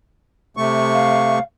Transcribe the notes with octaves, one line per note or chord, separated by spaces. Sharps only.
C3 A3 C#6
F5